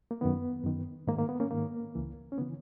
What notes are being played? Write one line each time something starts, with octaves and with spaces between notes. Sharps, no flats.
A#3
F#2 D#3 B3
F#2 D#3
G#2 D#3 A#3
A#3
B3
A#3 C#4
G#2 D#3 A#3
C#2 C#3 E3
C#4
C#3 E3 B3